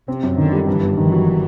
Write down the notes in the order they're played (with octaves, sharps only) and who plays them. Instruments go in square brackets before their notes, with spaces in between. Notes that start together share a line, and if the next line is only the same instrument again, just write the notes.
[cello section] C3 [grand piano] C4
[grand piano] F#2
[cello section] D3 [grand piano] D#3
[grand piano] G3
[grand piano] G2 [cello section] E3
[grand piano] G1
[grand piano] D#3 [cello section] E3
[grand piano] F#3